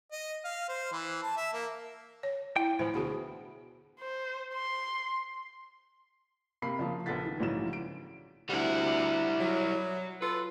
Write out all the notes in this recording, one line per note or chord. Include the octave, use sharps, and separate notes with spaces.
D#5
F5
C5
E3
A5
E5
A#3
C#5
E4 G5
A2 E3 F3 C5
D2 B2 F#4 G#4 B5
C5
C6
C3 A#3 B5 C7
C#3 F3 A#3
A#1 B3 A4 F#5 A6 B6
D#3
A#1 G#2 C#3 E3 F#3 E7
D7
D2 C3 G3 E4 F#5
F#3
F4 A4 B4